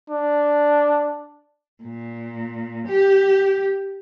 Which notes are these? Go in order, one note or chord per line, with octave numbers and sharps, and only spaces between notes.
D4
A#2
G4